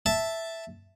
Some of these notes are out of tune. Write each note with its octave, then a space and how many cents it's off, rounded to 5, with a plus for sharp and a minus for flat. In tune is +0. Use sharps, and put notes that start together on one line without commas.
E5 +0 A5 +0